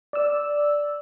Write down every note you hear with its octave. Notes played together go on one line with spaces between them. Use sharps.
D5 E6